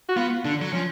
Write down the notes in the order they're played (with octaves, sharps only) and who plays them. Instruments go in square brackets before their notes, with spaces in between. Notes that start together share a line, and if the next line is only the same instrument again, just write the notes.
[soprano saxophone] F#4
[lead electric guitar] B3 [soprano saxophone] F4
[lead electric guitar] D3 [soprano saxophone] D4
[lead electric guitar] F#3
[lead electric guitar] F3 [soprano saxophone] C#4